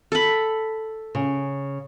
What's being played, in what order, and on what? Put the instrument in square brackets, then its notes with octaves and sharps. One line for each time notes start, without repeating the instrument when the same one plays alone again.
[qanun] A4 B5
[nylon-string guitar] C#3